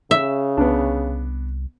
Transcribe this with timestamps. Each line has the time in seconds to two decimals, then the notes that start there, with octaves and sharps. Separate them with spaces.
0.11 C#3 E5
0.57 C2 B3 D4